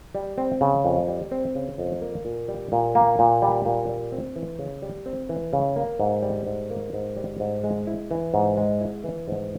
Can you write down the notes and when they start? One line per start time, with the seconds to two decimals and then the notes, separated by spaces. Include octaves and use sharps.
0.15 G3
0.38 C4
0.61 C#3
0.85 F2
1.08 G3
1.31 C4
1.55 C#3
1.78 F2
2.01 A#3
2.25 A#2
2.48 G3
2.72 A#2
2.95 A#3
3.19 A#2
3.42 G3
3.65 A#2
3.89 G3
4.12 C4
4.36 E3
4.59 C#3
4.82 G3
5.06 C4
5.29 E3
5.53 C#3
5.76 A#3
6.00 G#2
6.23 G3
6.47 G#2
6.70 A#3
6.93 G#2
7.17 G3
7.40 G#2
7.64 G#3
7.87 E4
8.11 E3
8.34 G#2
8.57 G#3
8.81 E4
9.04 E3
9.28 G#2